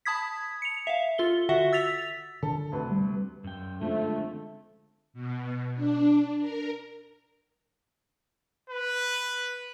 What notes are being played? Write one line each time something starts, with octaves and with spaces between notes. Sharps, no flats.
A5 B5 D#6 G#6 B6
C#7 F7
E5 F5
F4 A4 G7
D3 F#4 E5 F#5
E6 A6 B6 F7
D3 A4
D2 C3 B4
G3
F#2 G5
D3 F3 G#3 A3 C4
B2
D4
A#4
B4